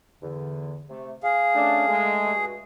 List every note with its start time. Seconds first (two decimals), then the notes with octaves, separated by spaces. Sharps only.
0.22 E2 D3
0.89 C3 A3
1.23 G#4 F5
1.54 A3 C#4 D4
1.87 G#3 A3
2.25 G2 F#4